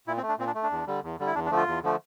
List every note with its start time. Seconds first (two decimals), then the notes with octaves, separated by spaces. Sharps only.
0.07 A#2 E4
0.17 C4
0.23 A3
0.29 D4
0.39 A#2 C4
0.47 D4
0.55 A3
0.63 D4
0.71 E2
0.87 D3 G3
1.03 E2
1.19 D3 G3
1.26 E4
1.35 E2 D4
1.46 D4
1.51 D3 F3 A3
1.57 F4
1.67 E2
1.83 D3 F3 A3